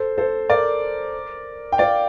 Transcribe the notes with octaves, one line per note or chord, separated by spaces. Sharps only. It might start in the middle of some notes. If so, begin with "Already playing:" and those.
Already playing: A4 C5
A4 C5
A#4 D5
G5
D5 F5